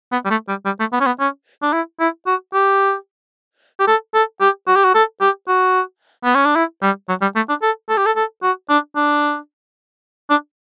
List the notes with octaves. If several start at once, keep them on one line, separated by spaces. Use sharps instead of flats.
B3
G3
A3
G3
G3
A3
B3
C#4
B3
C#4
D4
E4
E4
F#4
G4
G4
A4
A4
G4
F#4
G4
F#4
A4
G4
F#4
B3
C#4
D4
E4
G3
F#3
G3
A3
D4
A4
A4
G4
A4
A4
F#4
D4
D4
D4